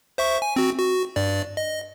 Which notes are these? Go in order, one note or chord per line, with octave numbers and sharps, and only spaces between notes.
C5 E5 C#6
G#5
C4 F#4
F#4
G2 D5
D#5